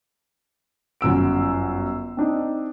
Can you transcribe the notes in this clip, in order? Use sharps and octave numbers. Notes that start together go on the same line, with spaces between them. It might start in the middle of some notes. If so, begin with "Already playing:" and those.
G1 F#2 E6 D7
C4 D4 D#4